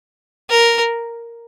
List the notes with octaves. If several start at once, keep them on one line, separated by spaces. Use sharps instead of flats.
A#4